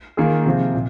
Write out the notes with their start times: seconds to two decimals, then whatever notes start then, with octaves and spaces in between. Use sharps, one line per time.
0.17 D#3 A#3 F4 G#4
0.45 C3 F3 C4 F4 G#4
0.74 A#2